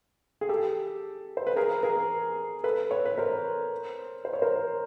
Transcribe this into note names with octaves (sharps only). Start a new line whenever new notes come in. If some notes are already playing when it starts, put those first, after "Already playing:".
G#4
G4 A4
C5
B4
G#4 A#4
G#4 A#4
A4 B4
B4 C#5
B4
A#4 C5
C5
C#5
A#4 C5